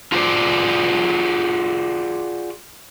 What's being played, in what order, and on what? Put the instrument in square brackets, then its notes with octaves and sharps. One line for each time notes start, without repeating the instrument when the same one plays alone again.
[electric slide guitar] F4 F#4 G#4 B4 C5 D5